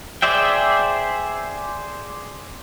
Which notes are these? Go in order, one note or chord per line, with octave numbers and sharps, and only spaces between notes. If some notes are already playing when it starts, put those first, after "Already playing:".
G#4 C5 D5 E5 G5